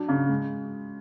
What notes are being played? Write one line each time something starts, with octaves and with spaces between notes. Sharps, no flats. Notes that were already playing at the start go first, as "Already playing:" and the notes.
Already playing: F#3 D4
C#3
G#3